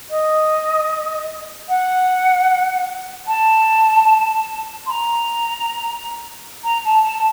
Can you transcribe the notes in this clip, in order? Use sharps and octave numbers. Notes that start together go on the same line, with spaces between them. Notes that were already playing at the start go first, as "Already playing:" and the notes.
D#5
F#5
A5
C6
A#5
A#5
A5
A5